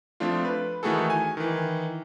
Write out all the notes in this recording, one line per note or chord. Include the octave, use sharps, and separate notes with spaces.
F3 A3 C4 D4 F4
B4
D#3 E3 A3 F#4 G#4 A4
G#5
D#3 E3